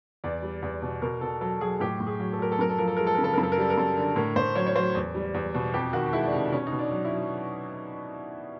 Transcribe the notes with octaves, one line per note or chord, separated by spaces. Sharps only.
E2 D5
G3
E2
B2
B2 A#4
B2 A4
F#3 A4
F#3 G#4
A2 G4
A2
G#4
F#3
A4
F#3 A#4
A4
F#2 A#4
A4
F3 A#4
A4
G#3 A#4
A4
C#3 A#4
A4
F#2 A#4
A4
A#4
G3 A4
A#4
F#2 A4
D3
A2 A#4
A2 C5
F#3 C#5
C#5
F#3 C5
E2
G3
E2
B2
F2 G4
D#3 F#4
G#3 E4
D4
C3 D#4
B2 C#4
D#4
B2
D4
F#3
E4
F#3